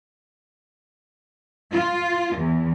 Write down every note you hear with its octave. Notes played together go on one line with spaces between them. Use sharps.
F4
E2